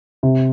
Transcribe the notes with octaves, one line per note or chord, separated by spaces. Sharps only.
C3